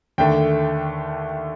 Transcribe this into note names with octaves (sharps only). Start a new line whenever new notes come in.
D#2 D3 A3 G5